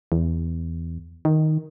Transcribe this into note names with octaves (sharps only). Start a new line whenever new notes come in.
E2
D#3